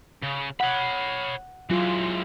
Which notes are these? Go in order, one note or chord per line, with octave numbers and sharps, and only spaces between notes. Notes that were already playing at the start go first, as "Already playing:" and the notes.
C#3
C#5 F#5 B5
E3 F#3 G#3 F4